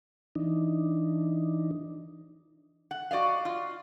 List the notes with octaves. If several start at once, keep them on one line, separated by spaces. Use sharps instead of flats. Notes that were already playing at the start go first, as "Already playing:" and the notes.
E3 D4 D#4
F#5
F#4 D5 D#5 F5
F4